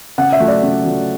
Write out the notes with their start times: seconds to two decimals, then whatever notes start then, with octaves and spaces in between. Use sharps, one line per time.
0.18 C#3 F#5
0.32 E5
0.40 F#3 A3
0.48 D5
0.62 C#3
0.85 F#3 A3